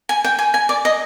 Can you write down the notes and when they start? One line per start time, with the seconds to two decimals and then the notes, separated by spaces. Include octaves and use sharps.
0.09 G#5
0.24 G5
0.39 G#5
0.54 G#5
0.69 D5
0.85 D#5